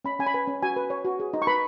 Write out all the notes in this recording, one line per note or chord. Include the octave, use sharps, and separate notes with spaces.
C#4 B5
C#4 G#5
B5
B4 G#5
C#4
F#4 G#5
B4
C#5
F#4
G#4
D#4
C#6
B4 B5